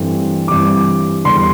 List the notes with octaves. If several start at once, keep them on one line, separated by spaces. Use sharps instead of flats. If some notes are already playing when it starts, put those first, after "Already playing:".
Already playing: G2 E3 A3 C4
G2 E3 G3 C4 D6
E2 D3 G3 C6